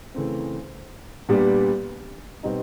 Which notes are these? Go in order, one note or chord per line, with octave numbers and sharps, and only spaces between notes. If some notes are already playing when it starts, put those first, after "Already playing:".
C#3 E3 A3 C4
A#2 G3 B3 D4 G4
B2 G3 C4 D#4